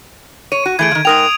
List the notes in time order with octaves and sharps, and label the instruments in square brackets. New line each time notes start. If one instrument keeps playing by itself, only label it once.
[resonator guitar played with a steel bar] C#5 [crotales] D#7
[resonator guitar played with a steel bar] F#4
[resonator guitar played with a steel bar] E3 A3 G#4 [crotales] G#6 D7
[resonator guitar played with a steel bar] D#3 F3
[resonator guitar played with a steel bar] G#2 A#4 G5 [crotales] D#6 F7